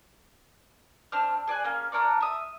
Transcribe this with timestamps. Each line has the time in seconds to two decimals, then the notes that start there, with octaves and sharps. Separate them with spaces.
1.12 C4 D4 F6
1.48 G#4 D5 G#5 F#6
1.64 A#3 C#4
1.92 D4 A#4 C#5 D5
2.21 E5 D#6